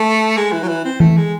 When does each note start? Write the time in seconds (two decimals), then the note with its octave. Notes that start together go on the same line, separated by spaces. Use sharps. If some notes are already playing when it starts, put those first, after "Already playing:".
Already playing: A3
0.37 G#3
0.52 E3
0.63 F#3
0.68 E3
0.84 C4
1.00 E3 A3
1.17 G#3